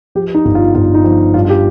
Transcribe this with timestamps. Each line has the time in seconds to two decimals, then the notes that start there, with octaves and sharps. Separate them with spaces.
0.15 F3 G4
0.34 D#4
0.45 G1
0.55 F4
0.75 G1 F4
0.94 D#4
1.04 F3
1.34 G2 F4
1.45 F4
1.50 G4